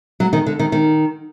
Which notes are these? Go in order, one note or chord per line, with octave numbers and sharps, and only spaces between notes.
F#3
D#3
D3
D#3
D#3